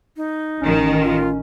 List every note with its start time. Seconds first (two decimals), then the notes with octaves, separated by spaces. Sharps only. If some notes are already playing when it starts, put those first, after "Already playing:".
0.17 D#4
0.61 A1 D#3 C#4
1.03 F4